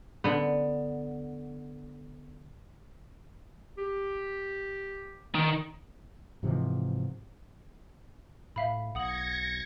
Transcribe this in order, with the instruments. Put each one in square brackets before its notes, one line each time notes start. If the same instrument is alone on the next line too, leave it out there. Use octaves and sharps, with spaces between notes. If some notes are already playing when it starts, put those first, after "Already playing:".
[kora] D3 B3
[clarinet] G4
[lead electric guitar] D#3
[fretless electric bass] G#2 C3 E3 F3
[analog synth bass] A2 [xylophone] E5 F5 B5
[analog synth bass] B1 [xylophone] F#5 D#6 F#7 [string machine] G#6 A#6 C#7